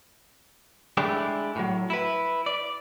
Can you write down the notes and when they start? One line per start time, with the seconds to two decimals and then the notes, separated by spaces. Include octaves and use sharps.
0.97 G#3 A3 D4 E4 G4
1.56 A2 F#3
1.90 E4 B4
2.46 D5